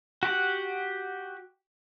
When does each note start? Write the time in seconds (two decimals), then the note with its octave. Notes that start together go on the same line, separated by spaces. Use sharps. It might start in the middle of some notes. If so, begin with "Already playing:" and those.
0.23 F#4 G4 F#5